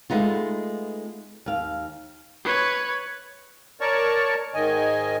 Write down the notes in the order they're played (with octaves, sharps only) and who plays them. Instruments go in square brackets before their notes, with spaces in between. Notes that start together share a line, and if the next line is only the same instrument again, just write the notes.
[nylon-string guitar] G#3 A3 B3 D#4 F4
D#2 F5
[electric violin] B4 C#5
[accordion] A#4 C#5 D5 A5 A#5 C#6
G#2 D#3 D#5 G#5